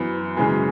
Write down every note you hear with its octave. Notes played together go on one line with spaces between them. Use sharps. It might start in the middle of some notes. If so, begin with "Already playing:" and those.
Already playing: F#2 E3 B3
F#2 C#3 E3 G#3